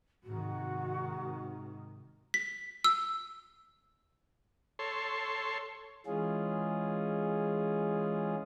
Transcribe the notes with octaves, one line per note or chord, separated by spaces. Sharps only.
G#2 C3 D#3 F#4
B6
E6
A4 C#5 C6
E3 G#3 C#4 F4 G#4